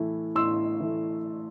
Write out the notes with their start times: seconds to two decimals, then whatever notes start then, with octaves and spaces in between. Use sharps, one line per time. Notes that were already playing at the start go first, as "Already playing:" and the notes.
Already playing: A2 E3 A3
0.35 A2 C6 E6
0.80 E3 A3